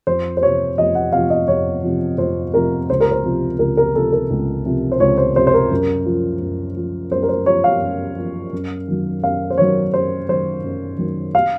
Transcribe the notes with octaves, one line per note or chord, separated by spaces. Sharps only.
F2 C5
C5
C3 F3 C#5
F2 D#5
F#5
C3 F3 F5
D#5
F2 C#5
C3 F3
F2 C5
C3 F3 A#4
C#2 C5
A#4
C5
C3 F3
C#2 A#4
A#4
C3 F3 A4
A#4
C#2
C3 F3
C5
C#2 C#5
C5
C3 F3 C5
C5
A#4
F#2
F3
F#2
F3
F#2 C5
A#4
C5
F3 C#5
F5
F#2
F3
F#2
D#3 F#3
F#2 F5
C5
D#3 F#3 C#5
F#2 C5
D#3 F#3 C5
F#2
D#3 F#3
F5